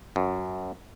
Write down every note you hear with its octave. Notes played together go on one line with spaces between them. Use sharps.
F#2